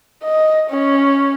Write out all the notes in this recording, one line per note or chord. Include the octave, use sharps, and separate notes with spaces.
D#5
C#4